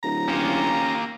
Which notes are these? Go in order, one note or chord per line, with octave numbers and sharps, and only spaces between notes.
D1 A#5
A#3 C#4 F4 G4